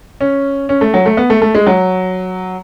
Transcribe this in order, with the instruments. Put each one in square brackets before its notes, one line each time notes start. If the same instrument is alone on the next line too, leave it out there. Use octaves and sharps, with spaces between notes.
[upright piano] C#4
C#4
A3
F#3
A3
B3
A3
A3
G#3
F#3